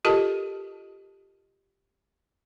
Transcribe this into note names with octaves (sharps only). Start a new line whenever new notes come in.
F4 G4 A4 A#4 D#5 A5